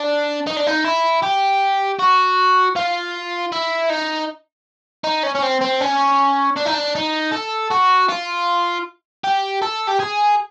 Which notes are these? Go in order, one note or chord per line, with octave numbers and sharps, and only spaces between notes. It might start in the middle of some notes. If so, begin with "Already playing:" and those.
Already playing: D4
D#4
D4
D#4
E4
G4
F#4
F4
E4
D#4
D#4
C#4
C#4
C4
C4
C#4
D4
D#4
D4
D#4
A4
F#4
F4
G4
A4
G4
G#4